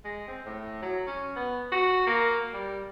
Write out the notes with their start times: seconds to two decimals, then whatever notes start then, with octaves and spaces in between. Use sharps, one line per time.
0.05 G#3
0.28 C4
0.45 A2
0.82 F#3
1.07 C#4
1.36 B3
1.72 F#4
2.07 A#3
2.53 G3